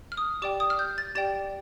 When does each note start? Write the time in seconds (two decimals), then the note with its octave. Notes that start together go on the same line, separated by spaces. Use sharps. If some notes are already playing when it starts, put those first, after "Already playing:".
0.12 F6
0.17 D#6
0.42 G4 D5 G5 D6
0.60 D#6
0.70 F6
0.79 G6
0.98 A6
1.15 G4 D5 G5 A6